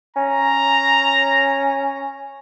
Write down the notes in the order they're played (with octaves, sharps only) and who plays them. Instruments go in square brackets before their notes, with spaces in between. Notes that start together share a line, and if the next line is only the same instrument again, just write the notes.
[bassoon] C#4 [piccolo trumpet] A#5